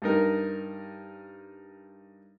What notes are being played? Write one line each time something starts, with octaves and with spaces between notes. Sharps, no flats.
G2 D#4 A#4